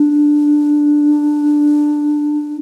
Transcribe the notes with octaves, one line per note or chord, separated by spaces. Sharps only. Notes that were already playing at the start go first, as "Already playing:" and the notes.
Already playing: D4